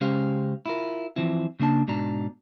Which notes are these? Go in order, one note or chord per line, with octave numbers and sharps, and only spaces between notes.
C#3 G#3 C#4 G4 C5 F5
E4 F4 A#4
E3 F3 C4 E4
C#3 A#3 D4 A5
G#2 B2 D4 A#5